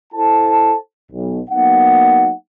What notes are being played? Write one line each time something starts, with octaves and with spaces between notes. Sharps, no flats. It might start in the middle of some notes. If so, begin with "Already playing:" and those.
E4 A4 C5 A5
B1
F#3 A#3 B3 D#4 F#5